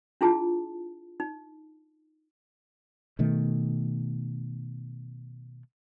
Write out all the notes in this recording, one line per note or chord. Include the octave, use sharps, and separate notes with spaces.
D4 E4 F4 G#4 A5
D#4
B2 D#3 A3